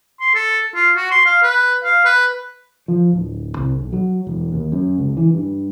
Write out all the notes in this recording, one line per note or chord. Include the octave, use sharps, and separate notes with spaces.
C6
A4
F4
F#4
C6
F5
B4
F5
B4
F3
D1
C2
B1
F#3
E1
D#2
F#2
C#2
E3
G2